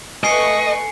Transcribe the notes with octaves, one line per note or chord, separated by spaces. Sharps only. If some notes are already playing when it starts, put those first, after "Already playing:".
A3 B4 D#5 G#5 C#6 C7 C#7